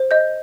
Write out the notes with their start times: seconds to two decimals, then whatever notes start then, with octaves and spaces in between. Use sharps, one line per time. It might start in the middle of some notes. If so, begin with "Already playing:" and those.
Already playing: C5
0.11 D#5 G6